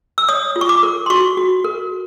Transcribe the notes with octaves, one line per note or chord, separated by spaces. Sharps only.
E6
C#5 D#6
F4
C#6
D6
A#4
C6
F#4 C#6
F#4
A#4